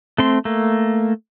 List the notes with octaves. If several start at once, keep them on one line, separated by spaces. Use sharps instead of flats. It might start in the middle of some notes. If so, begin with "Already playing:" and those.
A3 C4 C6
A3 A#3